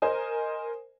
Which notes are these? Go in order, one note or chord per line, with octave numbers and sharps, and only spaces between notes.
A#4 C5 D#5 G#5